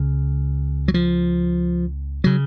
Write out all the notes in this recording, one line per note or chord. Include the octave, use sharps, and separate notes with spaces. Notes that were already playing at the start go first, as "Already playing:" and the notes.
Already playing: C#2 C#3
F#3
F3
C#3 F#3